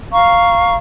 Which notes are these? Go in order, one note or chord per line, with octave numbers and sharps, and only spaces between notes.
F5 A#5 C#6